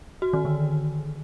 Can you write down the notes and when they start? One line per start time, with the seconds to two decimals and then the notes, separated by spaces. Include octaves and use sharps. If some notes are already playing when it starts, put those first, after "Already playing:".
0.22 F#4
0.33 D#3
0.45 D3